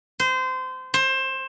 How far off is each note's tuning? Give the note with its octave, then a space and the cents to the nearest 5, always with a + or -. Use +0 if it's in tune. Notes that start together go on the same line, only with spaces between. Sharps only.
C5 -25
C5 +20